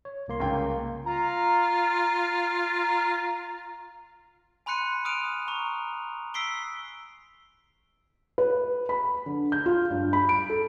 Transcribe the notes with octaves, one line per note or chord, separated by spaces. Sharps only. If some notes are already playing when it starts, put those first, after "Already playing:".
C#5
C2 A#3 C6
C#2 C#3 G5
F4 A#5
G#5 B5 C6 F#6 C#7 D#7
D#6 F6 F#6 D7 D#7 F7
A#5 C#6 F7
E6 B6 C7 D7 G7
B4
B5
D3
G6
F4
G2
B5
D7
A4